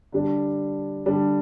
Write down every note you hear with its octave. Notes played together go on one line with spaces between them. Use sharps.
D3 G3 D4
D3 G3 D4